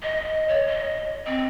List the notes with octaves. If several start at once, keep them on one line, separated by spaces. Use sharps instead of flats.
D#5
C#5
D#5
C4